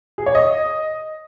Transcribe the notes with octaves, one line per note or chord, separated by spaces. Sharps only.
G#4
C#5
D#5